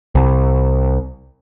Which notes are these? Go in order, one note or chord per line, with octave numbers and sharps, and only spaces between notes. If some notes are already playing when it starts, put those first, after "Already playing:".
C2